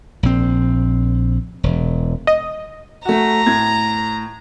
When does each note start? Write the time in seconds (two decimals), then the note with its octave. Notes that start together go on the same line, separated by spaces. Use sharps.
0.23 A#1 C4
1.63 E1
2.27 D#5
3.05 A3 F#4 A#5
3.46 A2 G#6